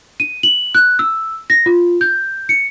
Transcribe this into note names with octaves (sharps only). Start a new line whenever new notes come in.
D#7
F#7
F#6
E6
A#6
F4
G6
C#7